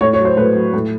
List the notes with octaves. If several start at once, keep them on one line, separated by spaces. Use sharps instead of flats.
A2 C#5
C#5
F#3
C5
A2 B4
F#3
A2